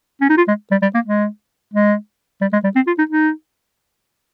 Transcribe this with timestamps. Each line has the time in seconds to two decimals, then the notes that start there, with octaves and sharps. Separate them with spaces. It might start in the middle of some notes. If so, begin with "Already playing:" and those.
0.21 C#4
0.30 D#4
0.37 F4
0.48 G#3
0.71 G3
0.82 G3
0.94 A#3
1.06 G#3
1.74 G#3
2.41 G3
2.53 G#3
2.64 G3
2.75 C4
2.87 F4
2.98 D#4
3.10 D#4